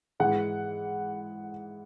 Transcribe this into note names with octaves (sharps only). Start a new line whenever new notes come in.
G#2 E3 G#3 F#5